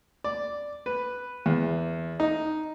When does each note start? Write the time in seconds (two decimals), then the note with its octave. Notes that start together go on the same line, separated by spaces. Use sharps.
0.24 D5
0.86 B4
1.46 E2
2.20 D#4